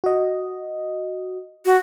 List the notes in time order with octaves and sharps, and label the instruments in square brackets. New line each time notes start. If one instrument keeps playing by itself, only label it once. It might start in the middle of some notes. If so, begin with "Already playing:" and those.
[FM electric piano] F#4 D#5
[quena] F#4